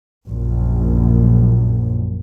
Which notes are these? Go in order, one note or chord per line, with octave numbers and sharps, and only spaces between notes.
A#1 F#2